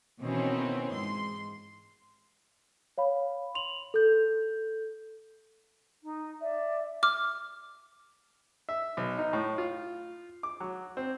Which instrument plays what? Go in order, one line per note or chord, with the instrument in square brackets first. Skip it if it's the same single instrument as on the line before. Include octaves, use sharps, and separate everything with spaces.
[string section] B2 D#3 E3 C4 C#4
G#2 C6
[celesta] C#5 F5 B5
C6 F7 F#7
A4 G6
[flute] D#4
[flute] D5 [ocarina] E5
[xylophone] D6 F6
[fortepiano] E5
B1
D#4
A2
F4
D6
F#3
C4